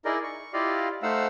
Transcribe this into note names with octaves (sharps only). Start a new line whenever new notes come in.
D#4 E4 G#4 A#4 D5 D#5
C#6
E4 F4 G4 D5 D#5 F5
A3 D#4 C5 F5 F#5 E6